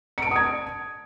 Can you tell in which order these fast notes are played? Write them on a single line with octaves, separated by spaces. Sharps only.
C#7 D7 A5 D#6 G#6